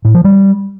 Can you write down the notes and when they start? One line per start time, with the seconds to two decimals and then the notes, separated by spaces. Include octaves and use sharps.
0.05 A2
0.15 F3
0.24 G3